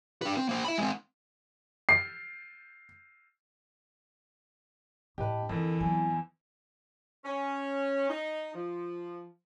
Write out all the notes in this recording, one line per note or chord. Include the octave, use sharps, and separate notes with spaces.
D4 B4
C4
A#3 C5
E5 B5
G#3 C4
C7
A2 G4 B4 D#5 A5
F2 D3 E3 A4 A#4
F#3 B3 E4 G#5
C#4
D#4
F3